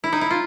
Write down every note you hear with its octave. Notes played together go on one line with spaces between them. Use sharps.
E4
D#4
E4
F4